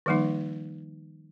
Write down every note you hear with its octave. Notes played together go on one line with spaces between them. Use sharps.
D#3 F3 G3 A#3 D#4